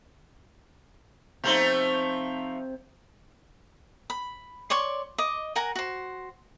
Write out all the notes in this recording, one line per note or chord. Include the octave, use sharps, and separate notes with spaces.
C3 F3 A3 D#4 C5
B5
C#5 D5 C6 C#6
D#5 D6
A#4 F#5 G#5 A#5
F#4 C5